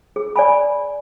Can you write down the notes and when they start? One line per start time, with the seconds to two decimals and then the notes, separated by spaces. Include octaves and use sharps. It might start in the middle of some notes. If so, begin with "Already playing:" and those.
0.16 G#4
0.36 D5 G#5 B5